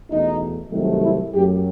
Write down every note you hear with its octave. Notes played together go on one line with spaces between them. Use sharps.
E2 B2 A3 D#4
C2 C3 D#3 F#3 A3
E4
F#2 F#3 A3 G4